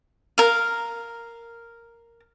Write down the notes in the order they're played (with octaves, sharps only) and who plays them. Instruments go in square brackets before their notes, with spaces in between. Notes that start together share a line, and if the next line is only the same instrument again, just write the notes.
[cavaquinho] A#4 F5